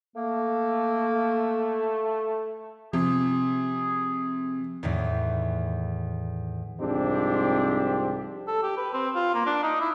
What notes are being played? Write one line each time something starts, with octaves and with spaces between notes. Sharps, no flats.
A3 A#3
C3 F3 G#4
E2 A2 D#3 E3
C2 G#2 F3 C4 D4 G4
A4
G4
B4
C4
F4
A#3
D4
D#4
E4